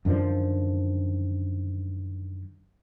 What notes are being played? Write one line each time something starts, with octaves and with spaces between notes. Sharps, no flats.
F#2 D3 D#3 F3